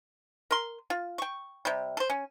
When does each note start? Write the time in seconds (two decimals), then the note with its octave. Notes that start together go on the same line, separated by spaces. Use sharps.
0.51 A#4 C6
0.90 F4
1.18 G5 C#6
1.65 C3 G3
1.97 A4 C5
2.10 C#4